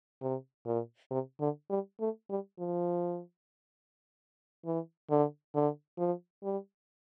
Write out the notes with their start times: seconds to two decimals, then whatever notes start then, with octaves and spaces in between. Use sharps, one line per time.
0.22 C3
0.66 A#2
1.11 C3
1.40 D3
1.70 G3
2.00 A3
2.29 G3
2.59 F3
4.66 E3
5.10 D3
5.55 D3
5.98 F3
6.43 G3